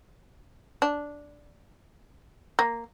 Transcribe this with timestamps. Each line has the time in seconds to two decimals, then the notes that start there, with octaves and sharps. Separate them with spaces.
0.82 D4
2.59 A#3